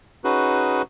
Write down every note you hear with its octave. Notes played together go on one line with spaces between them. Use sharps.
C#4 D#4 F#4 G#4 B4